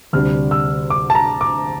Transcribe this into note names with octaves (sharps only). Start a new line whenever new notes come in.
D2 C3 G3 D4 F6
E6
D6
A5
A#5
D6